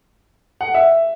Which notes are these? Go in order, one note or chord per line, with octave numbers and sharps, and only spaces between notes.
F#5
E5